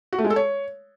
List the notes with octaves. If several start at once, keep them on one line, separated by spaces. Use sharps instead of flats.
F#4
A3
G#3
A4
C#5